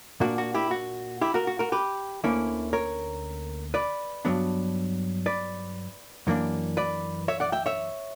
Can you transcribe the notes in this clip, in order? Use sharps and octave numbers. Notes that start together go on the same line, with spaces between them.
A#2 A#3 D4 F#4
F#4
E4 G4
F#4
E4 G4
F#4 A#4
F#4
F#4 A#4
G4 B4
D2 D3 A#3 C#4 E4
A#4 C#5
B4 D5
G2 F#3 B3 D4
B4 D5
F#2 E3 A#3 D4
B4 D5
C#5 E5
D5 F#5
E5 G5
C#5 E5